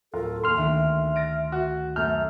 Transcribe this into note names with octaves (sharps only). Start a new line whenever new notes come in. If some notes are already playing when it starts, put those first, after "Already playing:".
D1 F4 A4 A#4
D#2 C6 F6
D2 D#3 E5
A6 A#6 D7
F#4
F#2 A3 F6 G6